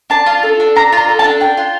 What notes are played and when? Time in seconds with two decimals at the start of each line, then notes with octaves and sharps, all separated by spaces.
0.10 D4 A5
0.26 F4
0.43 A4
0.60 D4
0.76 D4 A#5
0.92 F4 A#5
1.09 A4
1.19 A5
1.24 D4
1.40 D4 G5
1.57 F4